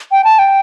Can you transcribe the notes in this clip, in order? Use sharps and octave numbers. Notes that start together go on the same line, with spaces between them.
G5
A5
G5